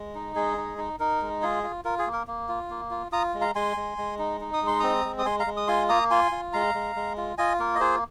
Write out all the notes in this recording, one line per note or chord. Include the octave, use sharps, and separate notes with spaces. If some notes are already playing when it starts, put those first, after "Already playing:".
Already playing: G#3
D#4
G#3 G#4
D#4
D#4
D#4 A#4
G#3
F4 G#4
F4
F4 A#4
G#4
A#3
A#4
A#3
F4
A#3
F4
F4 A#5 D#6
G#3
F5 A#5
G#3 G#5 C6
G#3
G#3
D#4
D#4
D#6
G#3
C6
C4 A#5 D#6
G#3
D#6
G#3 G#5 C6
F5 A#5
G#3
D#6
F4 G#5 C6
A#3 A#5 D#6
F4 G#5 C6
F4
G#3 F5 A#5
G#3
G#3
F4
F4 D#5 G#5
A#3 A#4
D#5
F4 G#4 C5